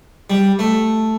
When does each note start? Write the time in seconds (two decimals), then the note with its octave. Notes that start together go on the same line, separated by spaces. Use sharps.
0.30 G3
0.59 A3